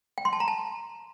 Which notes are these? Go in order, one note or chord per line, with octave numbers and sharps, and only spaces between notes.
G5
C6
A5
A#5
A5